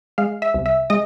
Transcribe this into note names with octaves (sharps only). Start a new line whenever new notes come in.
G#3 F5
E5
C2
E5
G#3 D#5